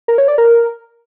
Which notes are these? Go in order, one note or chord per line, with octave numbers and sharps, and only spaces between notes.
A#4
C#5
D5
A#4